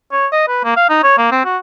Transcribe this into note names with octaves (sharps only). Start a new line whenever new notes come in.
C#5
D#5
B4
A#3
F5
D#4
C#5
A#3
C4
F#4